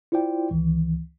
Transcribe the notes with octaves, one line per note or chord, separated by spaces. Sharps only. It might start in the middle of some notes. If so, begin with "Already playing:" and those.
E4 F4 C5 D5 G5
C#2 D#3 E3